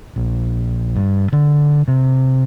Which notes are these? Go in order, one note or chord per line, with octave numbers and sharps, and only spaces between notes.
A#1
G2
D3
C3